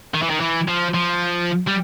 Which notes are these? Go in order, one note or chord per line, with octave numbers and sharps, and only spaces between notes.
D#3
E3
D#3
E3
F3
F3
G3